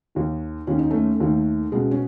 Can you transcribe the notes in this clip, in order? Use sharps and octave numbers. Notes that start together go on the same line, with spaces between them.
D#2 D#3
D#2 D#3 C#4
D#4
A3 C#4
D#2 D#3 A3
C#2 B2 G#3
C#4